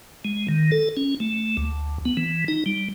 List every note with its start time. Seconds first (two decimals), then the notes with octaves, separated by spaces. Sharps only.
0.25 G#3
0.48 D#3
0.72 A4
0.97 C#4
1.20 A3
1.57 D2
2.05 B3
2.17 E3
2.48 D#4
2.66 G3